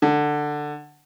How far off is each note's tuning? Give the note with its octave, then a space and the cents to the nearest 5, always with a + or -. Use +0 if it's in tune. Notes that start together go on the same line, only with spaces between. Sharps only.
D3 +10